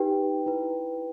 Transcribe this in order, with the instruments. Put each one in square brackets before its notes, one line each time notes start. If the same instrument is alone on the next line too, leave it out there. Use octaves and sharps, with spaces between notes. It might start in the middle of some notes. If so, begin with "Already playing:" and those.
Already playing: [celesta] D#4 G4 B4 G5
E4 B4